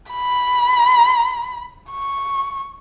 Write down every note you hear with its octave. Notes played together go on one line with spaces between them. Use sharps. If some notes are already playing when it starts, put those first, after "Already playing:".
B5
C#6